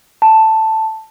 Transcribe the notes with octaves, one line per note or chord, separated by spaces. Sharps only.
A5